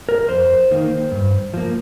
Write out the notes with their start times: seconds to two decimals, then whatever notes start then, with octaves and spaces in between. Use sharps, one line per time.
0.09 A#4
0.29 F2 C5
0.71 D#3 A#3
1.12 G2
1.54 F3 A#3